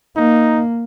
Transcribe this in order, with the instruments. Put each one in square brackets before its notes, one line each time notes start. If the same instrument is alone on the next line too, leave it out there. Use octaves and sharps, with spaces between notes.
[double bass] A#3 [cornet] D#4